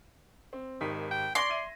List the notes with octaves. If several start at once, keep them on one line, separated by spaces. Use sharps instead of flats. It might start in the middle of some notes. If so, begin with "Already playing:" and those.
C4
G#1 D#3 G4 B6
G5
D5 C6 C#6 G#6 A#6
E5 G#6 D#7